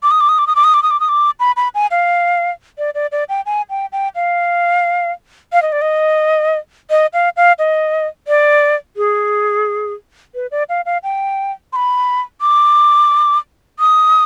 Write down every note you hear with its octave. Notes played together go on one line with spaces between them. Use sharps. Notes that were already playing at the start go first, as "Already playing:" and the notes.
D6
D#6
D6
D#6
D6
D#6
D6
D#6
D6
D#6
D6
D#6
D6
B5
B5
G#5
F5
D5
D5
D5
G5
G#5
G5
G5
F5
F5
D#5
D5
D#5
D#5
F5
F5
D#5
D5
G#4
B4
D5
F5
F5
G5
C6
B5
D6
D#6